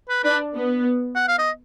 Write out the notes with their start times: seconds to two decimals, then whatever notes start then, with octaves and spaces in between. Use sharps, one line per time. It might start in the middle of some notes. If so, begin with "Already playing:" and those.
0.09 B4
0.23 D4 B4
0.55 B3
1.15 F#5
1.28 F5
1.39 D#5